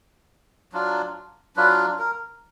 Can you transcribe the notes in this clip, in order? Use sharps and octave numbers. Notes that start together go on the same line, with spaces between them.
F#3 D4 F4
F#3 D4 F4 B4
A#4